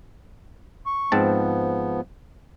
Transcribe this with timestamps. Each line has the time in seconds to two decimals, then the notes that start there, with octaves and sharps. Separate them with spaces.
0.86 C#6
1.12 G#2 F3 B3 C4 A5